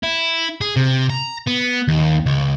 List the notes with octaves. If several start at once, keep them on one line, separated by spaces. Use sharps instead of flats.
E4
G#4
C3
A#5
B3
D#2
C#2